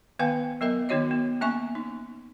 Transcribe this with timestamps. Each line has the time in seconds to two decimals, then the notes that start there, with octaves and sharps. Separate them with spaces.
0.19 D#3 B3 B4 F5 G5 G#5
0.61 F#3 B3 A#4 D#5 E5
0.89 D#3 B3 D#4 F#4 C#5 D#5
1.11 B3
1.41 A#3 C#4 E5 G#5 C#6
1.75 D#4